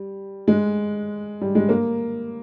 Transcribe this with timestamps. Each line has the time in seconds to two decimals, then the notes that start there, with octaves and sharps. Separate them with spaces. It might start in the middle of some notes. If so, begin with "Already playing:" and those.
Already playing: G3
0.48 G#3
1.41 G3
1.55 G#3
1.69 A#3